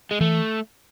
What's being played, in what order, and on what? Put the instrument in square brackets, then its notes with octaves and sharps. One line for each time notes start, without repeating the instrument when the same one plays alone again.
[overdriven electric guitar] G#3
[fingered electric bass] E3 [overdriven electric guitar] A3